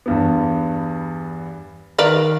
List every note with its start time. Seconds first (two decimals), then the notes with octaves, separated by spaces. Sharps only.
0.06 E2 G2 B3
1.98 D#3 A#4 B4 D5 F5